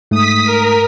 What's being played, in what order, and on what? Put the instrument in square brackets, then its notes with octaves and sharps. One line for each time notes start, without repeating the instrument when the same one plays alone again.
[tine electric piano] G#2 A3 [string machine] D#6 B6
[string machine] A#4